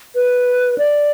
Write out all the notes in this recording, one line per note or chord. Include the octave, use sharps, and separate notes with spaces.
B4
D5